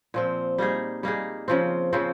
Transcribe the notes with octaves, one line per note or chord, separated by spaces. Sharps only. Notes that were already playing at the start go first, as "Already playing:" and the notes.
A#2 F3 C4
G3 A#3 D#4 G#4
G3 A#3 D#4 G#4
C#3 F3 C4
C#3 F3 C4